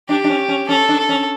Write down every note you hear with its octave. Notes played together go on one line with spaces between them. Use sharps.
D4 G4
D4
C#4
C#4
C#4 A4
D4
A4
C#4